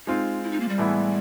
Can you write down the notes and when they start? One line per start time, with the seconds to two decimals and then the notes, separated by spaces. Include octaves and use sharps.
0.06 G#3 C4 D#4 F4
0.43 E4
0.51 D#4
0.60 A#3
0.69 G3
0.78 A2 E3 G#3 B3 E4